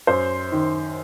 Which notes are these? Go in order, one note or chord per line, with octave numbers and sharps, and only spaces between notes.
F#2 C5
D#3